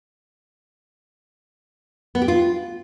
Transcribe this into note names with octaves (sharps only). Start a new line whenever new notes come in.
B3
G4
F4